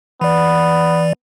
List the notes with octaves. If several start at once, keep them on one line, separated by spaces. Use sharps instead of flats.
E3 B3 D5